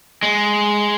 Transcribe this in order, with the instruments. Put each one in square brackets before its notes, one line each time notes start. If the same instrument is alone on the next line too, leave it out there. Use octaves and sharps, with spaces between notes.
[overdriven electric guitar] G#3